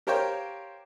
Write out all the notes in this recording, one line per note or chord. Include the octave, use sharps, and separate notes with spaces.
G4 A#4 C5 C#5 F5 G5